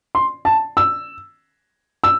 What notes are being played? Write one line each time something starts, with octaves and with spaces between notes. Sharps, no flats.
C6
A5
E6
E6